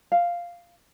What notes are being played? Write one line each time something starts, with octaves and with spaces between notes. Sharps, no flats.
F5